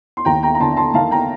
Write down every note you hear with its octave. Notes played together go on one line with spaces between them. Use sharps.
C6
D#2 G5 A#5
G5 A#5
A#5
D3 A5 C6
A5 C6
D#3 F5 A5
G5 A#5